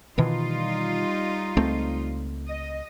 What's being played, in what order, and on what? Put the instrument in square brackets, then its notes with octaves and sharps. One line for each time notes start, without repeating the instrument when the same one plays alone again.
[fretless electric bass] B2 D#3 E3 [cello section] G3 D#4 F4
[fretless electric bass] C#2 A3 C4
[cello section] D#5